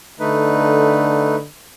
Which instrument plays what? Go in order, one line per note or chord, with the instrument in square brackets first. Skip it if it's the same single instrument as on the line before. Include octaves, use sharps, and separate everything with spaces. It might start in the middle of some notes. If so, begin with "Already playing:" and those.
[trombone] D3 [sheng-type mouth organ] A3 D#4 B4